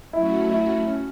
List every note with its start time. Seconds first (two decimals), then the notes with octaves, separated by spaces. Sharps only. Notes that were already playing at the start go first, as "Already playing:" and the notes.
0.13 F#3 A3 C#4 E4 F#4
0.50 E4
0.87 C#4